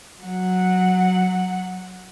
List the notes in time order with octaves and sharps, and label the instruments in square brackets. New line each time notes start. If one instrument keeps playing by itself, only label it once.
[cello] F#3 F#5